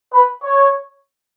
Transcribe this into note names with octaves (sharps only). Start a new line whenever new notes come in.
B4
C#5